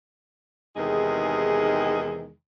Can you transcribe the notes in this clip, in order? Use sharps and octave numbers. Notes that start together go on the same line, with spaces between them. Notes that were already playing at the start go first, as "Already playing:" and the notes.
E2 C3 D#3 G#3 D#4 G#4